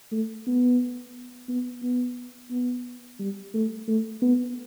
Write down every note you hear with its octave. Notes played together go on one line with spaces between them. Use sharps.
A3
B3
B3
B3
B3
G3
A3
A3
B3